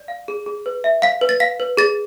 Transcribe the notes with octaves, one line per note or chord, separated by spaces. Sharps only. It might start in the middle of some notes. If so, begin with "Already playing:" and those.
Already playing: D5
F5
G#4
G#4
B4
E5
F5 B6
B4
A6
F5 B6
B4
G#4 A6